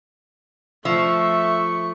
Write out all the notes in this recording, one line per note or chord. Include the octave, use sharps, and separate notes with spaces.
F3 A3 E5 C#6